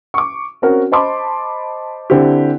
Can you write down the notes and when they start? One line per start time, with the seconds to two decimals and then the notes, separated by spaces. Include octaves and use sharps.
0.14 C#6 D6
0.62 C4 C#4 F#4 A#4
0.92 C5 D#5 A5 B5 C6 D6
2.10 D3 C4 E4 G4